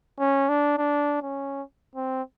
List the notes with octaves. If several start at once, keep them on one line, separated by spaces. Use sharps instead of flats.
C#4
D4
D4
C#4
C4